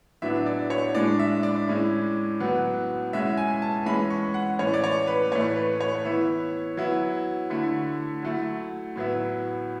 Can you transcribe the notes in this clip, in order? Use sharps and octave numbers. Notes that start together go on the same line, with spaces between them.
A2 F#3 B3 D4 E5
D5
C#5
A2 G#3 D4 D5
E5
D5
A2 G#3 C#4 E4
A2 F#3 B3
B2 G#3 C#4 E4 E5
G#5
A5
E3 G#3 C#4 E4 B5
C#6
F#5
A2 E3 A3 C#4 C#5
D5
C#5
B4
A2 E3 A3 C#5
B4
C#5
E3 B3 E4
F#3 B3 E4
D3 A3 E4
F#3 A3 E4
A2 F#3 B3 E4